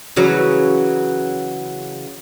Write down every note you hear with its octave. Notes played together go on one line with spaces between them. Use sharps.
C#3 E3 F#3